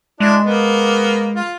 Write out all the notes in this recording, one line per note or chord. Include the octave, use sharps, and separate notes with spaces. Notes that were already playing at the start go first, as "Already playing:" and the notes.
G#3 D4 E4
A#3 B3
F4